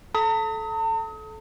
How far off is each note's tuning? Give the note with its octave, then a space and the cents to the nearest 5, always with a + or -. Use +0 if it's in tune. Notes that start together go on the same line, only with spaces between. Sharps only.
A4 -20 A5 +45 D#6 +35